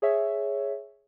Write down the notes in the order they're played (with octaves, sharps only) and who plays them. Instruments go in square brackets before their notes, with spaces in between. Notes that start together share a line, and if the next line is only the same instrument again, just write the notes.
[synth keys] G#4 C#5 E5